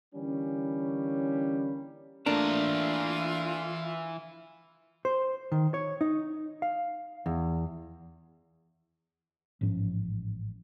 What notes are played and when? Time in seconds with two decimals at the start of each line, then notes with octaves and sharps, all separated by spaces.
0.15 D3 E3 G3 A#3 C#4
2.26 E3 A3 A#3 D4 F4 A#5
5.05 C5
5.52 D#3
5.74 C#5
6.01 D#4
6.62 F5
7.26 E2
9.61 A1 G#2 F3 C#4